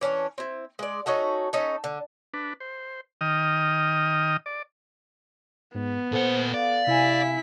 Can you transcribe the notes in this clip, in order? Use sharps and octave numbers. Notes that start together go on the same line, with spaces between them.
E3 C#4 D4 C#5
C4 E4
G#3 D5
C#4 D#4 F#4 A4
C#4 D#4 A4
D3
D4 B4
C5
D#3 D#5 G5 D#6 F6
D5
G#2 B3
A#2 A4 C5 F#5
D5 F5
C3 E4 G#5 B6